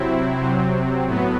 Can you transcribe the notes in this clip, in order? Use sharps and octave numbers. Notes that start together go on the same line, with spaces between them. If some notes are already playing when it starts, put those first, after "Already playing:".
Already playing: C3 F#3 C4 E4
C3 F#3 C4
A2 F#3 B3